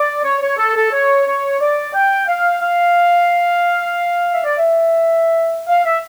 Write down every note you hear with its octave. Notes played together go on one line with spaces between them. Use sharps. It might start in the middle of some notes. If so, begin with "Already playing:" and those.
Already playing: D5
C#5
C#5
A4
A4
C#5
C#5
D5
G5
F5
F5
E5
D5
E5
F5
E5